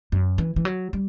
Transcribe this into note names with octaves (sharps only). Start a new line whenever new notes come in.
F#2
E3
E3
F#3
G3